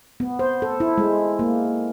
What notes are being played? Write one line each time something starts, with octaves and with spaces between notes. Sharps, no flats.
B3
C5
A4
E4
G#3
A#3